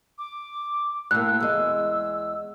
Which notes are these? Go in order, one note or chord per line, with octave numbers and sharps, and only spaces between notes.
D6
A2 A#3 E6 F#6
E2 G#3